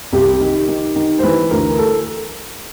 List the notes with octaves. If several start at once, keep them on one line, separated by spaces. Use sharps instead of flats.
C2 G4
D#3
D#3
D#3
C5
E3 B4
D2 A#4
A4